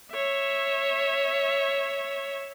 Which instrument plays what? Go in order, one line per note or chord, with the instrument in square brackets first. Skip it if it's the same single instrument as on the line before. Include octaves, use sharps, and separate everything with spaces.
[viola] C#5 E5